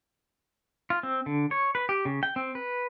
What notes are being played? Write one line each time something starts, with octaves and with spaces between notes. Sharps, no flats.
F4
C4
D3
C#5
B4
G4
C#3
G5
C4
B4